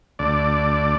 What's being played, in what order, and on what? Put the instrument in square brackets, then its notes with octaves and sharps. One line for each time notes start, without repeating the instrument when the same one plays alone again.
[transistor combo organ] D2 D5